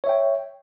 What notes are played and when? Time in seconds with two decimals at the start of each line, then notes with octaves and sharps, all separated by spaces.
0.04 C#5
0.06 E5
0.09 G5